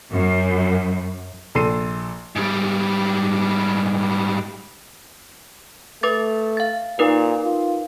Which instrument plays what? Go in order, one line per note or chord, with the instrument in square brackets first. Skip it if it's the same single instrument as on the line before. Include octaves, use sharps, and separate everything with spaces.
[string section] F#2
[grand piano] A#1 A4 C6 C7 D#7
[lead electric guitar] G#2 G3
[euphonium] A3 [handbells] B4 D6 A6
[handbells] F5 A6
[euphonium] A#2 [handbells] D#4 A#4 B4
[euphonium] F4